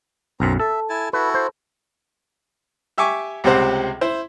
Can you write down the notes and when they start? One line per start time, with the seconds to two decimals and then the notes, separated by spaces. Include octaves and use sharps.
0.40 B1 F#2 C4 A#5
0.59 A4 E5
0.89 E4 G#5 A5
1.13 E4 F#4 A4 B4
1.34 C5
2.98 G4 E5 G#5 C#6 D6
3.44 C#2 C3 G3 C4 C5 F#5
4.01 E4 C5